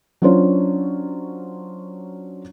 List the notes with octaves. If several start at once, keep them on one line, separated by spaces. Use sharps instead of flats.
F#3 C#4 D4 F4 C5 C#5